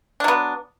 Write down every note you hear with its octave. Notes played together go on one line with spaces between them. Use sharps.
F#3 B3 D4